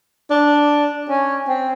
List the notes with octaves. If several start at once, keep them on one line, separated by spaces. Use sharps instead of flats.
D4
C#4
C4